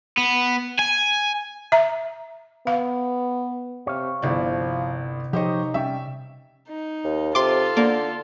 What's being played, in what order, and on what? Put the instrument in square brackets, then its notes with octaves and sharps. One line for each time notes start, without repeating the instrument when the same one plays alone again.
[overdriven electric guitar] B3
G#5
[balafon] E5 A#5
[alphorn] B3 [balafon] F5
[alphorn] C3 [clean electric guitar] C#5 F5
[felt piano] G1 E4 D5 [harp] C3 [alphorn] F3
[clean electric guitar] F3 C#5 [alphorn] D#4 [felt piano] G4 C5 D#5
[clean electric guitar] G3 C#4 G5 [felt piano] E5
[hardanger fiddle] D#4
[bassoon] D#2
[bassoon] C3 [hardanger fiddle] F4 A4 [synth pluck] C6 D6
[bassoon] D3 [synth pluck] A#3